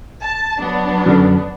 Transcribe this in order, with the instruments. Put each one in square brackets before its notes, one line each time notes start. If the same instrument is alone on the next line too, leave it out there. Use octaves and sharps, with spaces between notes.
[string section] A5
F#3 B3 D4
[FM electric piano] F#2 D3